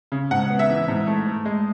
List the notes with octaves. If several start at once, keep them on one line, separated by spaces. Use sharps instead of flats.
C#3
G#2 F#5
B3
E5
E3
G#2
A3
A3
G#3